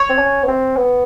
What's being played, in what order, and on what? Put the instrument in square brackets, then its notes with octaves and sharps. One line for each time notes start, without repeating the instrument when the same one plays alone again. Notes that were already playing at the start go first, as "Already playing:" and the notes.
Already playing: [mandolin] C#5
[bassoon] C4
C#4
B3
C4
B3